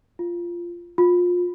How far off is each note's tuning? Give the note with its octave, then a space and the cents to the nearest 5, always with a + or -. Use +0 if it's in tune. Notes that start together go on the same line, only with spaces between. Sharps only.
F4 -10
F4 +25